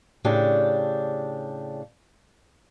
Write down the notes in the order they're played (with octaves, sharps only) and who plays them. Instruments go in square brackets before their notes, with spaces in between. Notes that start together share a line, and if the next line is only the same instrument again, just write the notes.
[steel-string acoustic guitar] A2 C#3 D4 G4